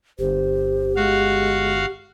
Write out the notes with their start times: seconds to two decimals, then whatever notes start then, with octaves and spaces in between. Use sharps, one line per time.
0.19 G1 G4 C5
0.96 G#3 F#4 F5